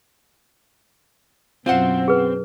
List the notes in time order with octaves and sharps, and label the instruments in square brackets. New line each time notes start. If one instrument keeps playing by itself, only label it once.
[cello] F#2 B2 [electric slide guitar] C4 [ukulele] F4 C5 F#5
[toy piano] G#4 B4